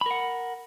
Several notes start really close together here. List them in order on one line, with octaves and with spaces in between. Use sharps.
B5 A#4 F#5